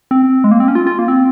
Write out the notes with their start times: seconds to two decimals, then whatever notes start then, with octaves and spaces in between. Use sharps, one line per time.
0.11 C4
0.44 G#3
0.51 A#3
0.60 C4
0.68 C#4
0.75 F4
0.87 F4
0.99 A#3
1.08 C4